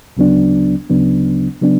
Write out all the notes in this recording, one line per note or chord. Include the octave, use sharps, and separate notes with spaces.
D2 C#3 F#3 B3 D4
D2 C#3 F#3 B3 D4
C#3 F#3 B3 D4